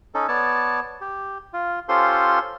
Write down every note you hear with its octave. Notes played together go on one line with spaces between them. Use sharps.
C#4 D#4 A4
B3 C#5 D5 A5
G4
F4
C#4 F4 G4 A4 C5 C6